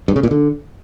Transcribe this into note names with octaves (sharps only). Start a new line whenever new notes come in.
G2
C#3
A#2
D3